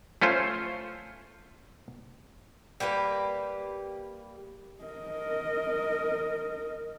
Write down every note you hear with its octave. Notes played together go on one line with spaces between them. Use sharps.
A3 C#4 F4 C5
G3 A#3 G4 B4
A#4 D#5